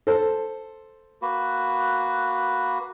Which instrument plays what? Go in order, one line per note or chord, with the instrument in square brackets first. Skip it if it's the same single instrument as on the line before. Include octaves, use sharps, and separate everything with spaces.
[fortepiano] A4 C5
[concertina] A#3 F#4 B4